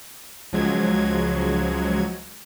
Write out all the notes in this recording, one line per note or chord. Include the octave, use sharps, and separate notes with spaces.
C#2 F3 F#3 G#3 G#6